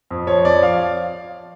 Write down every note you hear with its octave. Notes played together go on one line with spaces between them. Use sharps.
F2
F3 C#5
F2 D5
F3 F5